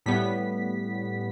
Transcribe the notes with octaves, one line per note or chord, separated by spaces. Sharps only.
A2 G3 B3 B6